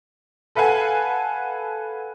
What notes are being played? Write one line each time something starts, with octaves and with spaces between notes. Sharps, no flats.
A4 B4 F5 F#5 G#5 A5